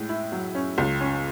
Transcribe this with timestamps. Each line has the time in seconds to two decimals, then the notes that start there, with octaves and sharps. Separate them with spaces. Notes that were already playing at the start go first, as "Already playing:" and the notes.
Already playing: A2 G#3
0.09 E4
0.32 F#3
0.55 C#4
0.78 C#2
1.01 C#4